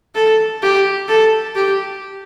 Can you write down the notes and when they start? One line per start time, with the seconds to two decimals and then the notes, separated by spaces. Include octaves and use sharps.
0.15 A4
0.62 G4
1.08 A4
1.55 G4